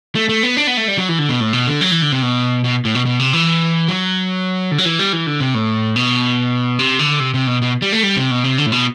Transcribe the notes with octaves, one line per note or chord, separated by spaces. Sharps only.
A3
A3
B3
D4
B3
A3
G3
F#3
E3
D3
B2
A2
B2
D3
F#3
E3
D3
C3
B2
B2
A2
B2
B2
C3
E3
F#3
D3
F#3
E3
G3
E3
D3
C3
A2
B2
C3
D3
C3
C3
B2
B2
G3
A3
G3
C3
B2
C3
D3
A2
B2